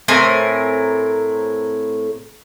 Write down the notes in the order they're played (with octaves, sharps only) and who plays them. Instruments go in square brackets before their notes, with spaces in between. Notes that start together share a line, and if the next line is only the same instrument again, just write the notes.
[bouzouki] A2 C4 A#4 G#5